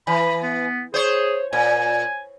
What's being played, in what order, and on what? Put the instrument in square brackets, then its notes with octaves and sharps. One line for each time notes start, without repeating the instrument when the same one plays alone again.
[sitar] E3 [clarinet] B5
[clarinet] B3
[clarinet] G#4 [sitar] C5 C#5
[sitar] A#2 [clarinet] G#5